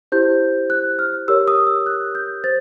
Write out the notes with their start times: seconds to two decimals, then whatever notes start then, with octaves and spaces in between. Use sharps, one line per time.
0.12 E4 G4 C5 G6
0.70 F#6
0.99 F6
1.28 G4 A#4 C#5 E6
1.48 D#6
1.67 E6
1.86 F#6
2.15 G6
2.44 C5 A6